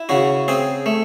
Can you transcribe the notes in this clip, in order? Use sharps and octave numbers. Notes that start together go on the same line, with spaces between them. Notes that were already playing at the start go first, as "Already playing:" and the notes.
Already playing: E4
C#3 F#4
C4 G#4
A3